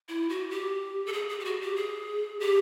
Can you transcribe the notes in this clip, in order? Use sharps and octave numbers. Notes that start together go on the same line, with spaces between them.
E4
F#4
G4
A4
G#4
G#4
G4
F#4
G4
G#4
G4